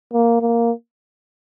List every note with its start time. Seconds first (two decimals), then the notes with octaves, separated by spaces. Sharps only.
0.13 A#3
0.41 A#3